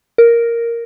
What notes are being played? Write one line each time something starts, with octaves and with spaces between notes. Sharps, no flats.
A#4